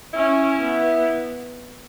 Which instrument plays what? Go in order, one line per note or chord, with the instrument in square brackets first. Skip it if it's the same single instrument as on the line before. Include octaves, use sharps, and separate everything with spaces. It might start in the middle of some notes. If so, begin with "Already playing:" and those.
[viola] C#4 [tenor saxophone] E4
[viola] B3